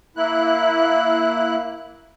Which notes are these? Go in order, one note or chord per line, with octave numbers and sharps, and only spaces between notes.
A#3 E4 F#6